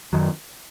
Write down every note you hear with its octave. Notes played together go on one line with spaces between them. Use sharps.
F#2 D#3 F#3